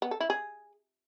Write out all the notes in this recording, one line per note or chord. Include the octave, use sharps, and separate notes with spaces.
B3
A4
E4
G#4